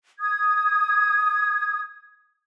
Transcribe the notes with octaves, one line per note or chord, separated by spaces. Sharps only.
D#6 G#6